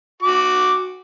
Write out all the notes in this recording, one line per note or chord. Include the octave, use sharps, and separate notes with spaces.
F#4 D6